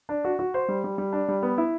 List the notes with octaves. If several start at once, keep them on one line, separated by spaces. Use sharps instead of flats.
D4
F#4
F#4
C5
G3
G3
G3
D4
G3
B3
E4